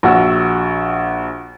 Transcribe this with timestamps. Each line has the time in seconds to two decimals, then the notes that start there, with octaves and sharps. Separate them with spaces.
0.03 A#1 F#4 F#5 E6